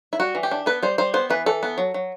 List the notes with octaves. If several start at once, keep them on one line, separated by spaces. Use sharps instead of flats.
E4
G3 F#4
E3
G4
D4
B3 B4
G3 C5
G3 C5
B3 C5
E3 B4
E3 A4
B3
F#3
F#3